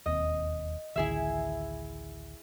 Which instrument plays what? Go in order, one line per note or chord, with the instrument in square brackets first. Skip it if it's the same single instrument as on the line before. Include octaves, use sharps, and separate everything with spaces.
[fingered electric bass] E1 D#2 C4 [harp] D#5
[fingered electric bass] A1 D2 D#3 [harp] E4 G#4 E5